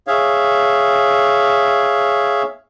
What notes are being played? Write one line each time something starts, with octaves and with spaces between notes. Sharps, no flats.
G#4 C#5 E5 F5